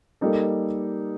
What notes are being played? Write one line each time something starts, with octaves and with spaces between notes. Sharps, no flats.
G3 A#3 D#4 A4